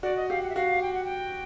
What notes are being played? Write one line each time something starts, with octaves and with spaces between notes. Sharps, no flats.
F#4 D5
D#5
G4 F5
F#5
E5
F#4 F5
G5
F#5
G5